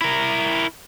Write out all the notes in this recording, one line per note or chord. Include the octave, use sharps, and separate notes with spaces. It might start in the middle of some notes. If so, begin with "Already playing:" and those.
E4 A#4